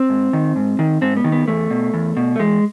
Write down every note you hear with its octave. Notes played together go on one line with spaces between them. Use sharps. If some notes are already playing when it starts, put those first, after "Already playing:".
Already playing: C4
G#2
D#3
G#2
D#3
G#2 C4
B3
D#3
B3
E2 A3
B2
E2
B2
A3
E2 G#3